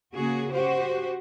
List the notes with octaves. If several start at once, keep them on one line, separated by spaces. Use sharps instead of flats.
C#3 A#3 F#4 G#4
F#4 G4 C5